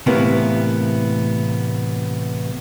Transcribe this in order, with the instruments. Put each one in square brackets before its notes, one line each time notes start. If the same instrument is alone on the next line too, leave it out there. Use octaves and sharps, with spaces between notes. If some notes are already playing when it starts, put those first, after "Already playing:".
[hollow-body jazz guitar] A2 C3 E3 A#3 B3